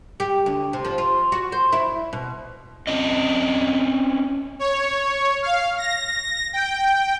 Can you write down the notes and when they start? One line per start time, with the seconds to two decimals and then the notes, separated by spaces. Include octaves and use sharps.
0.20 G4
0.46 D2
0.73 C3
0.85 F3
0.98 F4
1.32 F#4
1.52 C5
1.72 E4
2.13 B2
2.87 C4 C#4 D#5
4.59 C#5
5.43 F5
5.78 A#6
6.53 G5